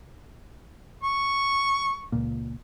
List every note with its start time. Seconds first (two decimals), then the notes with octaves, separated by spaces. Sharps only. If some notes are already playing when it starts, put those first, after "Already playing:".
1.03 C#6
2.12 C#2 A#2